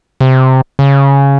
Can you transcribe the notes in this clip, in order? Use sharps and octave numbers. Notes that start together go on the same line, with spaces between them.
C3
C#3